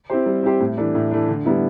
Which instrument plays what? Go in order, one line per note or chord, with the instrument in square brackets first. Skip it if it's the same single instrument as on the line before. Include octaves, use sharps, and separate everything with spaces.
[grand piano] C4 E4 G4 C5
G3
C4 E4 G4 C5
A2
E3 A3 D4
A2
E3 A3 D4
D3
G3 B3 E4